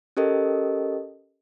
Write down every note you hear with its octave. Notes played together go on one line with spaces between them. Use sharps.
C#4 G4 A4 A#4 D#5